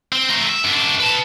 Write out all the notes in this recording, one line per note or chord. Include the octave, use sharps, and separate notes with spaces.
C4
A3 A#4
E5
F#2 D4
B4 A5